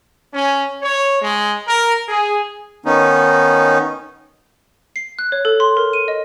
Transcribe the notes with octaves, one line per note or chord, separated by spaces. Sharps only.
C#4
C#5
G#3
A#4
G#4
D#3 B3 C#4 D#4
C7
F#6
C#5
A4
C6
A#4
D#7
D#5